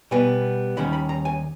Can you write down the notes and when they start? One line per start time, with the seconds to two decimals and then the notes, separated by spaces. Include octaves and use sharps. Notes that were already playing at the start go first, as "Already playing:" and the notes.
0.11 B2 G3 B3 G#5
0.77 D#2 D#3 G3 C#4 B5
0.93 B5
1.09 A#5
1.25 G#5